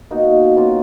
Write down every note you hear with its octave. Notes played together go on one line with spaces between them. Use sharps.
B2 A#3 D#4 F#4
B2 A#3 C#4 F4